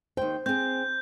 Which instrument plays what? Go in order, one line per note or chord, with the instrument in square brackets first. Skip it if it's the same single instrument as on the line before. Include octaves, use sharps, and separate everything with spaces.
[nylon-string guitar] D#2 G5 [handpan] C5
[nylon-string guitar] C4 G#4 [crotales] G6